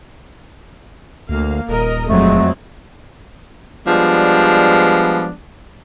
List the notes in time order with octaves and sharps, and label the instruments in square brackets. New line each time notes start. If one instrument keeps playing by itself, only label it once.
[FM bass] D2 [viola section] A#3 F5
[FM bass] D#1 [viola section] A#4 D#5
[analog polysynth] F2 F#3 [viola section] G#3 C4 [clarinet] A3
[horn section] F3 G3 G#3 B3 D4